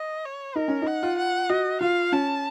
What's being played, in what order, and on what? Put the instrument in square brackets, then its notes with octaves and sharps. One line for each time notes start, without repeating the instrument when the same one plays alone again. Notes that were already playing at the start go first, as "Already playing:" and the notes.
Already playing: [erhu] D#5
C#5
[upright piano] D#4 [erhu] A#4
[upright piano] C#4
D#4
[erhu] F#5
[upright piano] F4
[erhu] F#5
[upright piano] F#4 [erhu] D#5
[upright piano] F4 [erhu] F5
[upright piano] C#4 [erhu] A5